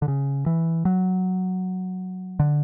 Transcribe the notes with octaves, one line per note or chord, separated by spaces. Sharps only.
D3
C#3
E3
F#3
D3